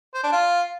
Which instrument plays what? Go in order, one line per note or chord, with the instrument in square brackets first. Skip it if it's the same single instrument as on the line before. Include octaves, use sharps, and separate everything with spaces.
[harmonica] C5
D4
F4